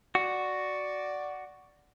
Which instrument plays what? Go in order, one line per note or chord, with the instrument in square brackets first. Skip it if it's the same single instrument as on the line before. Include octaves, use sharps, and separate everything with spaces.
[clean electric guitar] F#4 [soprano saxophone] D5